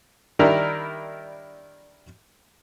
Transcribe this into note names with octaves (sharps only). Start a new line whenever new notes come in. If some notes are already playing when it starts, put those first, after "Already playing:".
D#3 G3 D4 E4 A#4